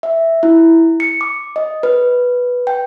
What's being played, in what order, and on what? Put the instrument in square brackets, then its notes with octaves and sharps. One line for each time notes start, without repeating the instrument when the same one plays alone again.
[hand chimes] E5
E4
C#7
D6
D#5
B4
G5